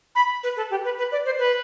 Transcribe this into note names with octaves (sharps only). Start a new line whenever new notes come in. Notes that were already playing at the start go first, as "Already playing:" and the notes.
B5
B4
A4
G4
B4
B4
D5
C5
B4